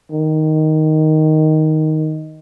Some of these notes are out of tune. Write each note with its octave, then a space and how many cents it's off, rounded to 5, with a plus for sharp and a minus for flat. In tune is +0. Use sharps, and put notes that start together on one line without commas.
D#3 +5